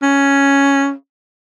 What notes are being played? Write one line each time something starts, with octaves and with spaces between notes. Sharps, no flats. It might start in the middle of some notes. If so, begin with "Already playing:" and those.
C#4